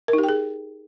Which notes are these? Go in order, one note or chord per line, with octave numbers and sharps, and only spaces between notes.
A#4
D#4
G4
G5
G#4